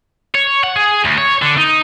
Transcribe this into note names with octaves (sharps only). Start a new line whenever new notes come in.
C#5
F#5
G#4
D2
C#5
D3
D#4